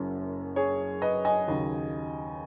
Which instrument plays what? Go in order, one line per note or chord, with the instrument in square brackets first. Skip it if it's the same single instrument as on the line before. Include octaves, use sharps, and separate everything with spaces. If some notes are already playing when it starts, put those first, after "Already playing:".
Already playing: [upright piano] F#1 F#2 F#3 C#4
G#4 C#5
B4 D#5
D#5 G#5
D#2 C#3 F#3